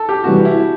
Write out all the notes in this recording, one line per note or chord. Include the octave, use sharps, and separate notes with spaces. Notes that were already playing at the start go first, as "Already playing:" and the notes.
Already playing: A4
G4
C3 E3 G3 F#4
E4